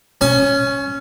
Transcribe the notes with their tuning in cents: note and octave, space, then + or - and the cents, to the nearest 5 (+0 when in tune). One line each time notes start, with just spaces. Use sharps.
C#4 +0 G#5 +35